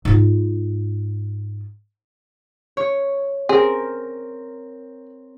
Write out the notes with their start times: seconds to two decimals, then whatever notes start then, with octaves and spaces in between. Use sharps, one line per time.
0.05 G#2 F4
2.77 C#5
3.49 C4 G#4 A#4